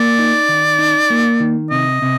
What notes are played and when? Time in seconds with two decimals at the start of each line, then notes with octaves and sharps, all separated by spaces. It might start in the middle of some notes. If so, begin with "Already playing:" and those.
Already playing: A#3 D5
0.19 D#4
0.49 D#3
0.79 D#4
1.10 A#3
1.40 D#3
1.70 C3 D#5
2.02 C3